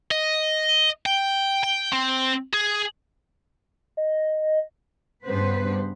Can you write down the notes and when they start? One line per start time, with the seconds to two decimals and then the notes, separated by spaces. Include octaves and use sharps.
0.11 D#5
1.06 G5
1.64 G5
1.93 C4
2.54 G#4
3.97 D#5
5.25 G2 C#3 B3 B4 C5